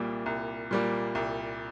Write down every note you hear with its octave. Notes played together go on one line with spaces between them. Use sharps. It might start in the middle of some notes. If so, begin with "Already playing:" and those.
Already playing: C2 A#2 G3 A#3
C2
A#2 G3 A#3
C2